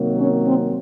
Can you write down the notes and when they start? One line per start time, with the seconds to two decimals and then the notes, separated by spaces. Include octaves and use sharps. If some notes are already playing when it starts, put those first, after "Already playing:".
Already playing: C3 D#3 F#3 A#3
0.18 C#4
0.46 C4